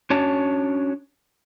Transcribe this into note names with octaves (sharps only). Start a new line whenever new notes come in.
C#4 D4 F#4 C#5 A5